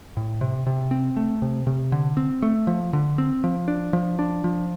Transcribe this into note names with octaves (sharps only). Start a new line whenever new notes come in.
A2
C3
C3
C4
A3
C3
C3
D3
C4
A3
F3
D3
C4
F3
D4
F3
D4
F3